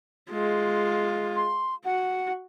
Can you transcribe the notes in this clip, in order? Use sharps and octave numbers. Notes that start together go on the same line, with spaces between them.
G#3 F4
C6
F#4 F#5